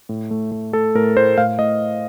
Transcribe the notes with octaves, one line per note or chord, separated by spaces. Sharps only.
A2
A3
A3
A3 A4
A2 A#4
A2 C5
A2 F5
A2 D#5